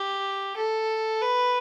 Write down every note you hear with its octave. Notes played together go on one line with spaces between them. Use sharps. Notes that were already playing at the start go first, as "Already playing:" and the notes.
Already playing: G4
A4
B4